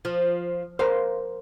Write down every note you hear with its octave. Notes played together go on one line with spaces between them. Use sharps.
F3
A#4 C5 F5